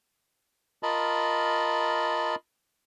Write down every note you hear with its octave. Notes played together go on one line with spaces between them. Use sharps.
F4 A#4 D#5 A5 B5